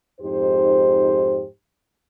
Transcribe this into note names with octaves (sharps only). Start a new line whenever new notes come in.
F2 G#2 D#4 G4 C5